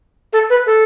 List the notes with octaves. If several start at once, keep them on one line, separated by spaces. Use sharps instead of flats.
A4
B4
A4